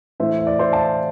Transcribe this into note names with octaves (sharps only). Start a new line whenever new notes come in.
A2 E3 A3 C5 E5
E5
D5
C5 E5
F5 A5